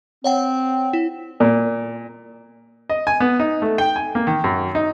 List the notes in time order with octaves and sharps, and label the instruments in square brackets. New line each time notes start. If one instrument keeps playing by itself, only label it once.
[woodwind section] C4 [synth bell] C#5 F#5 G5
[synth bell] E4
[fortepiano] A#2
D#5
G#5
B3
D#4
A3
G5
G#5
A#3
D#3
F#2
D#4